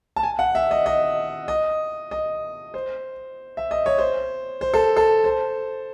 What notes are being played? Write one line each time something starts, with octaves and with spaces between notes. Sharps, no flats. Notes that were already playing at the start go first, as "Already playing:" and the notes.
A5
G#5
F#5
E5
D#5
D#5
D#5
D#5
C5
E5
D#5
C#5
C5
C5
A4
A4
C5